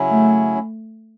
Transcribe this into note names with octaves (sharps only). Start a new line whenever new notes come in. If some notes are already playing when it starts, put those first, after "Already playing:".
Already playing: C#3 F#3 C#4 E4
A3